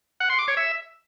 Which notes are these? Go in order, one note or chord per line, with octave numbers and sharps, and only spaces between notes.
F#5
C6
D6
C#5
E5